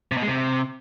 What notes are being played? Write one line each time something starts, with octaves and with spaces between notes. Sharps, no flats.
C3
B2
G#3
C3